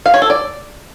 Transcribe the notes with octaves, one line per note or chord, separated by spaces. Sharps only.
F5
C#5
A4
D5